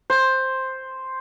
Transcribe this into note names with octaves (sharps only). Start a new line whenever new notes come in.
C5